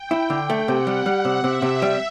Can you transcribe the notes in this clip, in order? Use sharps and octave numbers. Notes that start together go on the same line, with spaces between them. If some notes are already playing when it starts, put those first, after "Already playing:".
Already playing: G5
E4
D3
A3
C3 F#5
G3
G3
C3
C3 E5
C3
G3